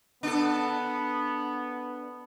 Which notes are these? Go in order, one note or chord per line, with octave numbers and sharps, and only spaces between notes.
B3 D4 A4